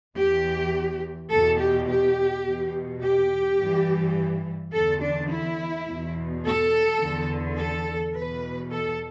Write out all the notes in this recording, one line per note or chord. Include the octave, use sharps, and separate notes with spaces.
E2 E3 G4
E2 B2 A4
G4
G4
E2 B2
G4
G2 E3
E2 D3 A4
D4
E4
E2 B2
A4
E2 D3
A4
E2 B2 B4
A4